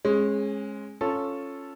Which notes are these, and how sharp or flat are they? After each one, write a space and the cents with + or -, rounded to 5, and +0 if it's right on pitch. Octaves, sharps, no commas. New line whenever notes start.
G#3 +0 C#4 -35
C#4 -5 F4 +0 A4 +0